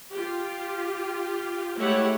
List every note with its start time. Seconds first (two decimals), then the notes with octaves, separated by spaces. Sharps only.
0.11 F4 G4
1.78 G#3 A3 E4 G4 C#5 F#5